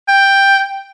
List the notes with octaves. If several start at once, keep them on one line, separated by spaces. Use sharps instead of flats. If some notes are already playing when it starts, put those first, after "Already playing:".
G5